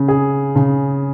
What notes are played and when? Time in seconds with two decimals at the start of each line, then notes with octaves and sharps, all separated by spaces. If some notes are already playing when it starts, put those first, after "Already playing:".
Already playing: C#3
0.08 G#4
0.56 C#3